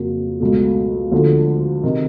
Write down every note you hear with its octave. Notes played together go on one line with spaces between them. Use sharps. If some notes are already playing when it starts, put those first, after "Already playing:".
Already playing: F2 C#3 F#3 A#3
C#2 B2 F#3 A3
D2 D3 F3
C3 D#3